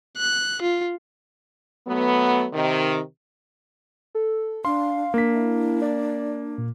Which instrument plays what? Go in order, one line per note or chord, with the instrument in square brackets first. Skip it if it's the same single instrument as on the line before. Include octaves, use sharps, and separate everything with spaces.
[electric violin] F#6
F4
[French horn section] F#3 A3 B3
C3 D#3
[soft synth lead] A4
[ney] D4 [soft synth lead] F5 [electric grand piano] C6
[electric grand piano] A#3 B6 [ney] D4
[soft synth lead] E4
D5
A#2